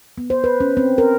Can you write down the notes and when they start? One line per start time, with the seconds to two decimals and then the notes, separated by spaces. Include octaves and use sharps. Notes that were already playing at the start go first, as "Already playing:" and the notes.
0.18 B3
0.30 C5
0.44 B4
0.60 C#4
0.77 C4
0.98 A#4